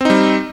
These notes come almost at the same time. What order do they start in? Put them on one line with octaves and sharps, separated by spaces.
C4 D#4 G3